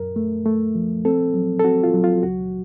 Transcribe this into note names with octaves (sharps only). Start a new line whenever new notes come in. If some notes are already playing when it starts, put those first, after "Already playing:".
Already playing: F#2 A#4
A3
A3
F3
C4 A4
F#3
A4
C4 F#4
F4
F#3
F4
C#2 F#4